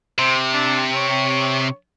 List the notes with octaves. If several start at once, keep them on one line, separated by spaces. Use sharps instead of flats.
C3 C5
D4
C#5